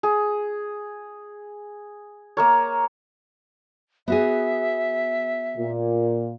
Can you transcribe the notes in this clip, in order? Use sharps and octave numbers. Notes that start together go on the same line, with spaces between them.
G#4
A#3 A#4 C#5
B3 F#4 G#4 E5
A#2